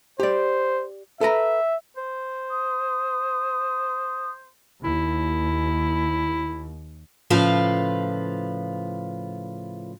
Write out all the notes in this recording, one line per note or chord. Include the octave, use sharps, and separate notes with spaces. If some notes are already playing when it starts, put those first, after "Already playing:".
G4 C5 D5
A4 B4 E5 A#5
C5
D#6
D#2 E4
A2 C#3 F3 F4 B4 F5